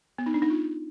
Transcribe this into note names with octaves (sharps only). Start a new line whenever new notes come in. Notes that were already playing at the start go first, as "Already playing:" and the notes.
B3
D#4
D4
D#4
F4